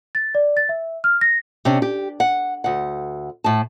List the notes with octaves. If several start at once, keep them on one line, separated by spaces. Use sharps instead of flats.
A6
D5
A6
E5
F6
A#6
C3 C#4 D4
G4
F#5
D2 F#5
A2 A5